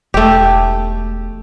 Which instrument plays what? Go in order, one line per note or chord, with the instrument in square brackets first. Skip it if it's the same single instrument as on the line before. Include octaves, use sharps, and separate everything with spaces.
[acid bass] E1 [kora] A3 G4